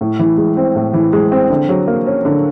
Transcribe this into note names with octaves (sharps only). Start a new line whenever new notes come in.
A2
E3
G#3
C4
A2
E3
G#3
C4
D3
F#3
A#3
C#4
D3